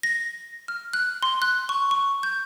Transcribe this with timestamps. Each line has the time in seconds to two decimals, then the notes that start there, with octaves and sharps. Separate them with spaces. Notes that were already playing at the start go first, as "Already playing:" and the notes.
0.03 A#6
0.68 F6
0.93 F#6
1.23 C6
1.42 F#6
1.69 C#6
1.91 C#6
2.23 G6